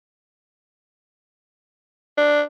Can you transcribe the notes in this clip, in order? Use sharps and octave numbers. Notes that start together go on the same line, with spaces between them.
D4